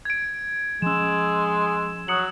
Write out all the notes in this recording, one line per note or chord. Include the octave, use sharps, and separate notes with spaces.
G#6 D7
F3 G#3 C#4 E6 E7
F#3 D#6 C#7 F#7